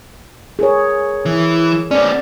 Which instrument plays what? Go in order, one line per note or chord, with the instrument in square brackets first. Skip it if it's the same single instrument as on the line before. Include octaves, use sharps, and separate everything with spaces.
[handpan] G#4 A#4 C#5
[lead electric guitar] E3
[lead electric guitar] B3 C#4 [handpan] D5